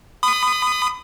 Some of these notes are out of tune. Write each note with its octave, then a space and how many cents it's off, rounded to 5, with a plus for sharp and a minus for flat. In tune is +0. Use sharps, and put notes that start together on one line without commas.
B5 +30 D#6 -15